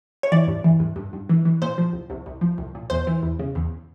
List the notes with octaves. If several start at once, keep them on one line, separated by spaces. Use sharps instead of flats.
C#5
E3 D5
G2
E3
G2
G2
G2
E3
E3
A#2 C5
F3
C2
C2
C2
F3
C2
A#2
E2 C5
E3
E2
C#3
E2